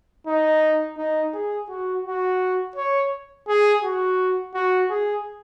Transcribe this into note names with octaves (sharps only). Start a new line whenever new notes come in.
D#4
D#4
G#4
F#4
F#4
C#5
G#4
F#4
F#4
G#4